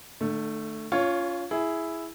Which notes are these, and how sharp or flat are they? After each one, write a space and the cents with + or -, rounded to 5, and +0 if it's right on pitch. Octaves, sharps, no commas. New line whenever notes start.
D3 +40 A3 +0
C#4 +35 F4 -5 C#5 +0
E4 +0 G#4 +5